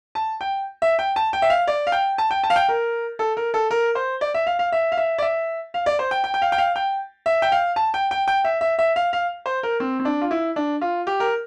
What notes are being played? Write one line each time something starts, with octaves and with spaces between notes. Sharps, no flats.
A5
G5
E5
G5
A5
G5
E5
F5
D5
F5
G5
A5
G5
A5
F5
G5
A#4
A4
A#4
A4
A#4
C5
D5
E5
F5
F5
E5
F5
E5
D5
E5
F5
D5
C5
G5
G5
G5
F5
G5
F5
G5
E5
G5
F5
A5
G5
G5
G5
E5
E5
E5
F5
F5
C5
A#4
C4
C4
D4
F4
E4
D4
F4
G4
A#4